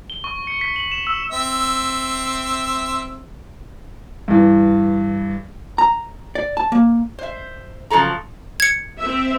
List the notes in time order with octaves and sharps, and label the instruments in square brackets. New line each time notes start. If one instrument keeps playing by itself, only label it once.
[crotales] G7
C#6
C#7
B6
F#7
E7
E6
[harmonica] C4 E5
[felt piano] G2 E3
[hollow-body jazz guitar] A#5
D5
A5
A#3
[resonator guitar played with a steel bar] C5 E5
C#3 F3 F#3 A4 A#5
[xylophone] G#6 C#7
[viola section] C4 E5